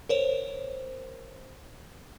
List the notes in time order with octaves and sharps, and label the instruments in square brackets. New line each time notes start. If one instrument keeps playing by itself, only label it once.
[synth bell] A#4 C5 C#5